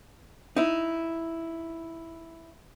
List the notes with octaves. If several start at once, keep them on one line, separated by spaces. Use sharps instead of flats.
D#4 E4